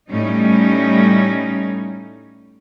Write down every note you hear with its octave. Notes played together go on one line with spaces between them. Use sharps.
A2 G3 C#4 D#4